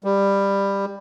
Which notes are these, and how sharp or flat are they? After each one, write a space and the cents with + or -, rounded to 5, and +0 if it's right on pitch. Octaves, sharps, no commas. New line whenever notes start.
G3 +15